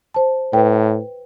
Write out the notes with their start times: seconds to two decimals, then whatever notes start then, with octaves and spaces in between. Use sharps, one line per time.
0.14 C5 A5
0.53 A2 B4 G5